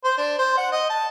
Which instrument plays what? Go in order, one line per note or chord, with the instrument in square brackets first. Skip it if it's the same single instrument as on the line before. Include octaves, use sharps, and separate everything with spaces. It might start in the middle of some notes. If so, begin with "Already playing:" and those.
[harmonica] C5
D4
C5
F#5
D#5
A5